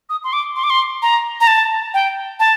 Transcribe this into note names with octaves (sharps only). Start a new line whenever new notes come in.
D#6
C6
D6
C6
D6
C6
A#5
A#5
A5
G5
A5